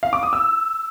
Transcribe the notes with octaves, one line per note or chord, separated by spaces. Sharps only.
F5
D6
D#6
E6